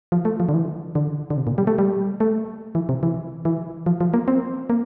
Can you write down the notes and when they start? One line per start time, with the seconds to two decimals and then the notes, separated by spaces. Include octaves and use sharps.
0.12 F3
0.25 A3
0.40 F3
0.49 D3
0.54 E3
0.95 D3
1.30 D3
1.37 C3
1.47 A#2
1.58 G3
1.67 A3
1.78 G3
2.20 A3
2.75 E3
2.89 C3
3.03 E3
3.45 E3
3.86 F3
4.01 F3
4.14 A#3
4.28 C4
4.70 A#3